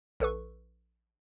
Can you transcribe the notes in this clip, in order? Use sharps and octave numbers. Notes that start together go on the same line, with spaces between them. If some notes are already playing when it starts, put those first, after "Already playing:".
A#1 A4 B4 C#6